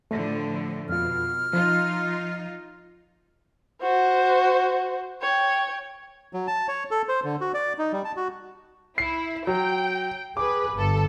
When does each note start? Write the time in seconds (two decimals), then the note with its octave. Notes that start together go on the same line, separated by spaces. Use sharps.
0.11 A2 D3 F3 A3
0.89 F2 B2 F4 F6
1.53 F3 D#4 F4
3.82 F#4 C5
5.22 C#5 G5
6.33 F#3
6.47 A5
6.68 C#5
6.91 A4
7.09 C5
7.24 D3
7.41 F#4
7.54 D5
7.79 D#4
7.92 G3
8.05 A5
8.17 F#4
8.98 E4 C7
9.47 F#3 G5
10.37 G#4 B4 D6
10.73 G1 A4